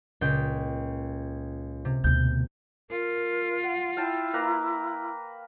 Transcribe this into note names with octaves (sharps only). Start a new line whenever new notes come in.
C#2 A#2 G5
C3
D2 B2 G6
F4 A#4
F#5
E4 F5 G5 A5
A#3 B4 A#5